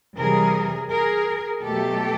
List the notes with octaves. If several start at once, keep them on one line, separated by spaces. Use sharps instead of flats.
C3 E3 G3 G#4 A#4
G#4 A#4
B2 F#3 A3 G4 A4